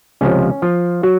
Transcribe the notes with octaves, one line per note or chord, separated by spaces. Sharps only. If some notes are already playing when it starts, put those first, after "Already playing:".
C#2 C3 F3 C#4
F3 F4
F#3 F#4